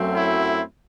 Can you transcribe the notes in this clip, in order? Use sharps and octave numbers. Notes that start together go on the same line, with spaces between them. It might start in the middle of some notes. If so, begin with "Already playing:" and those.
Already playing: F#2 F#3 A3 C4
E4